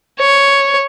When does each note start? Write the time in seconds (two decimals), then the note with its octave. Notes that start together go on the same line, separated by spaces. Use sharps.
0.20 C#5